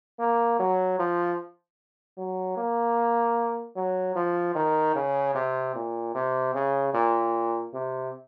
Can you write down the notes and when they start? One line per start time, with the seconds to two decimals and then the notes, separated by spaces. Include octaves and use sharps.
0.19 A#3
0.59 F#3
0.99 F3
2.18 F#3
2.57 A#3
3.76 F#3
4.15 F3
4.55 D#3
4.95 C#3
5.35 C3
5.75 A#2
6.15 C3
6.54 C#3
6.94 A#2
7.74 C3